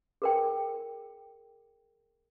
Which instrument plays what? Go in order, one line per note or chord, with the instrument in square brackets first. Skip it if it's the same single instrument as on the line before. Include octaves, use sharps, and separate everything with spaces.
[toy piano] G#4 A#4 G5